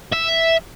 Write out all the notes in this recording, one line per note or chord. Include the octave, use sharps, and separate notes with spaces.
E5